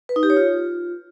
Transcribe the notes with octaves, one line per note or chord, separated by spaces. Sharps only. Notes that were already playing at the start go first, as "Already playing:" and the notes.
B4
D#4
G4
C#5
F4